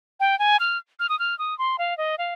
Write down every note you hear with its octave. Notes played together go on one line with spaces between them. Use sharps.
G5
G#5
F6
F6
D#6
F6
D#6
C6
F5
D#5
F5